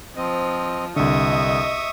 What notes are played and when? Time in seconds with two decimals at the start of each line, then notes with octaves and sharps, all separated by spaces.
0.16 F3 C4 D#5
0.96 C2 D3 D#5 E5 C#6 D#6